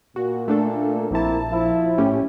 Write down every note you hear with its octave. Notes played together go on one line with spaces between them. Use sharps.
A#2 F#4
A3 D4 A4
A#1 A#3 C4 E4 A5
F3 E4
A2 C#4 G4